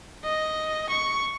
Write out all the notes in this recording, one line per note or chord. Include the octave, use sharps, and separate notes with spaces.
D#5
C#6